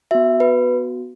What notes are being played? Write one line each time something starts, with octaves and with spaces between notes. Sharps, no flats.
B3 F#4 E5
B4